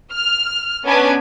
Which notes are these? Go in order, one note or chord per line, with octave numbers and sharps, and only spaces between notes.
F6
B3 C#4 D4 B4 G#5 D6